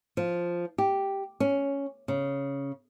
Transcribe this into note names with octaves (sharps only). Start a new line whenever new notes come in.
F3
G4
C#4
C#3